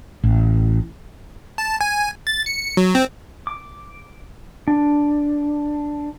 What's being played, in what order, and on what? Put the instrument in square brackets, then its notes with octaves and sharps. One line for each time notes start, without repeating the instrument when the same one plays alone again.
[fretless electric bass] A1
[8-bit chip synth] A5
G#5
A6
C#7
F#3
C4
[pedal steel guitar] D6
D4